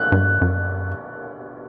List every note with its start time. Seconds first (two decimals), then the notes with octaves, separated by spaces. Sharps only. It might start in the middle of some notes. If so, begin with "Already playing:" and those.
Already playing: F#6
0.12 G2
0.41 F#2